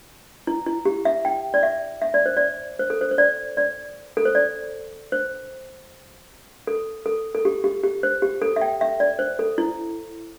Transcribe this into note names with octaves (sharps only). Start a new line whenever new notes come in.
E4
E4
G4
E5
G5
D5
E5
E5
D5
C5
D5
C5
A4
C5
C5
D5
D5
A4
C5
D5
C5
A4
A4
A4
G4
G4
G4
C5
G4
A4
E5
G5
E5
D5
C5
A4
E4